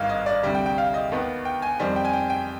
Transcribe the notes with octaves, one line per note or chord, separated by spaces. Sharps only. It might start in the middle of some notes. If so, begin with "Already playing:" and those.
Already playing: G#1 G2 D#3 F5
D#5
D5
D2 C3 G3
G5
G5
F5
D#5
D#2 D#3 B3
G5
G#5
F2 D#3 G3 C4
G5
G#5
G5
G5